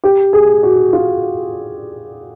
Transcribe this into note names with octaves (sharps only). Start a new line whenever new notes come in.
G4
G#4
F#4
F4